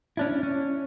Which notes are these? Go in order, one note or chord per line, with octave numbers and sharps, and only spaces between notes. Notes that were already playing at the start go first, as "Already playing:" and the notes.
C#4 D4 E4
C#4